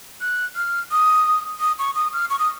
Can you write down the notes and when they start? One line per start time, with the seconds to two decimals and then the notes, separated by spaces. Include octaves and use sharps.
0.21 F#6
0.56 F6
0.91 D#6
1.60 D#6
1.79 C#6
1.95 D#6
2.13 F6
2.30 C#6
2.39 D#6